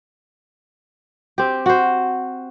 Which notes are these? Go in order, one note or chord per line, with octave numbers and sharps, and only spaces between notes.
C4 G4
F#4 C5